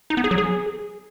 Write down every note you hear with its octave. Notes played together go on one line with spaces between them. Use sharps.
D#4
B3
G#4
F#3
G#4